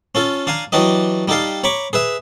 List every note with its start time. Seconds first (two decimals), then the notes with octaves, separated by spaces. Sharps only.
0.15 C#4 F4 A4
0.47 D4 F5 G#5 A#5
0.72 E3 F#3 D4 G4 D#5
1.28 G3 D#4 G4 A4 F5
1.64 C#5 A#5 B5 C#6 D6
1.93 G#4 B4 E5